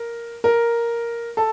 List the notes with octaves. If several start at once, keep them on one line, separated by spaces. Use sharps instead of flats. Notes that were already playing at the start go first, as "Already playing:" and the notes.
Already playing: A#4
A#4
A4